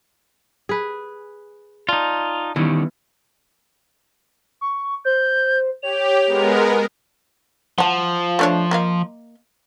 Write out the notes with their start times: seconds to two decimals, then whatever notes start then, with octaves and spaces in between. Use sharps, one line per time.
0.69 G#4 B4
1.89 D#4 F4 D5 A5
2.56 D#3 E3 G3 B3 C#4
4.61 C#6
5.05 C5 G6
5.83 G4 C#5 F7
6.27 G#3 B3 A#4
7.78 F3 F#5 A5
8.39 A3 D4 C#5
8.71 A#3 D#5 F5